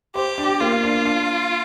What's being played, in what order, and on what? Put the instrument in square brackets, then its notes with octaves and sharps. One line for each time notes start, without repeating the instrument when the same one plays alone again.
[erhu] G4 [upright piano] C5
[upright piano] D4
[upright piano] A#3 [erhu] F4
[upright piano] D4
D4